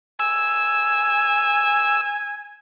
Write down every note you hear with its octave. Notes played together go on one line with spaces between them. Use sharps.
G#5 E6